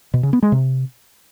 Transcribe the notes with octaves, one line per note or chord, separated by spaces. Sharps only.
B2
C#3
B3
G#3
C3